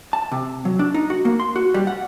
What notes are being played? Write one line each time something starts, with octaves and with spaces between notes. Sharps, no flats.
A5
C3
F#3
D4
D#4
F#4
A#3
C6
F#4
G3
F#5